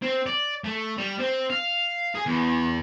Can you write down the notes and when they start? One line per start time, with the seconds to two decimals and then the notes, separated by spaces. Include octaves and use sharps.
0.03 C4
0.27 D5
0.64 A3
0.98 G3
1.19 C4
1.50 F5
2.15 G#4
2.27 E2